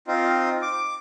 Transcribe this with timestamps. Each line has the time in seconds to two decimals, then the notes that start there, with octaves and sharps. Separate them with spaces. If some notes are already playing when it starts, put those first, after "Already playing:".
0.07 C4 D#4 F4
0.62 D6